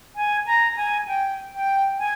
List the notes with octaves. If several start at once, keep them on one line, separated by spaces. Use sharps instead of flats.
G#5
A#5
G#5
G5
G5
G#5